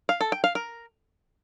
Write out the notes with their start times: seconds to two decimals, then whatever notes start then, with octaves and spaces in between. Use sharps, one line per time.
0.09 F5
0.21 A4
0.32 G5
0.44 F5
0.55 A#4